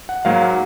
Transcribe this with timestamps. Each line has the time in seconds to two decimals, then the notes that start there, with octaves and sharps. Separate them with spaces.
0.09 F#5
0.25 G#2 F#3 A#3 F5
0.41 F#5